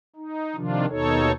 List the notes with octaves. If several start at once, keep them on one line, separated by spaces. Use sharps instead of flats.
D#4
C3 D#3 F3 D4 F4
D#2 B2 D#4 A4 C#5